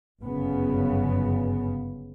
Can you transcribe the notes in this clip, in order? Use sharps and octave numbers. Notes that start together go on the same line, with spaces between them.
G1 F#2 C#3 B3